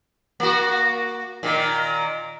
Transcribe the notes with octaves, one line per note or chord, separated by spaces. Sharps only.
A#3 F#4
A#2 D#3